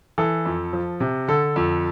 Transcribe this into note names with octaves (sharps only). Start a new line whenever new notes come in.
E3 A4
F2
F3
C3
D3 A4
F2